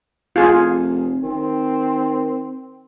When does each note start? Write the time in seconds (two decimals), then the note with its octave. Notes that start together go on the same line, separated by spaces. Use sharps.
0.36 F1 F4 G#4
1.23 D#3 C4